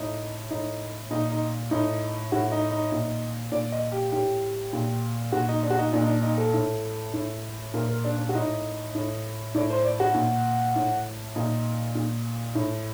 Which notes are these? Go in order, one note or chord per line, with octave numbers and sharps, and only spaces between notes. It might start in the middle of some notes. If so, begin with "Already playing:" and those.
Already playing: A2 D#4
A2 D#4
A#2 D#4
D#4
A2 D#4
A2 F#4
D#4
D#4
A#2
A#2 D5
D#5
G4
A2 G4
A#2
A#2 F#4
D#4
D4
F#4
D#4
A#2 D4
D#4
D4
D#4
A4
A2
A2
A#2 A#4
A#4
D4
D4
F#4
A2 D#4
A2
A2 D5
C5
D5
F#4
A#2
A2
A#2 D#4
A#2
A2